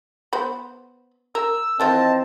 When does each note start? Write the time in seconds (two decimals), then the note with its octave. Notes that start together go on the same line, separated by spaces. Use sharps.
0.33 B3 C5 B5
1.35 A#4 E6
1.80 D#3 E3 C4 F4 D#5 A5